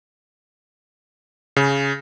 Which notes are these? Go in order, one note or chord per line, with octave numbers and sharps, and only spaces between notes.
C#3